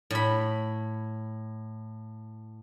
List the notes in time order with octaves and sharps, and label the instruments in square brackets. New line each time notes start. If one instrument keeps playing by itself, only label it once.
[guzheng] A2 B5